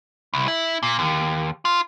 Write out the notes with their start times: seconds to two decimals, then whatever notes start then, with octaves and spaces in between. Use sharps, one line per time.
0.34 C2
0.48 E4
0.83 A#2
0.99 D#2
1.65 F4